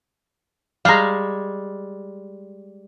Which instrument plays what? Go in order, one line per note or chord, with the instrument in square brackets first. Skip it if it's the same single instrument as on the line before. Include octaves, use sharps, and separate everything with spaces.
[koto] G3 G#3 [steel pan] F5 A#5